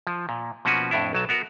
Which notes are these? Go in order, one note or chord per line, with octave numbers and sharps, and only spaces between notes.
F3
A#2
B2 F3 A#3 C#4 F#4 B4
F2 A2 D4 E4
B1 F#3 A5
B3 F#4 A#4